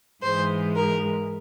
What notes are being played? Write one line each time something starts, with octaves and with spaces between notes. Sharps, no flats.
G#2 E3 G#3 C5
A#4